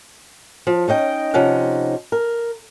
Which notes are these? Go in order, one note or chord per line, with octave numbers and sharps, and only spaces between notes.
F3
C#4 D#4 D#5 G5
C3 F3 C#4 D#4 F#5
A#4